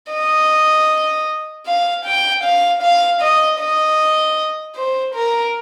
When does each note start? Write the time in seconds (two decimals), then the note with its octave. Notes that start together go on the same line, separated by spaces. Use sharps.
0.12 D#5
1.67 F5
2.05 G5
2.44 F5
2.82 F5
3.21 D#5
3.60 D#5
4.76 C5
5.15 A#4